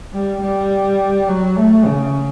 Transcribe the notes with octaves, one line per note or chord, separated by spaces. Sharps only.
G3
G3
F#3
A3
C#3